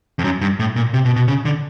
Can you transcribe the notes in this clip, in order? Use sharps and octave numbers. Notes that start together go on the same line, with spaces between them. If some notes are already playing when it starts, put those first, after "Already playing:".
F2
F#2
G2
A2
A#2
C3
B2
B2
C#3
D3